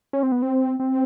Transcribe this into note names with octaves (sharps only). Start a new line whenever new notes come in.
C#4
C4
B3
C4
C4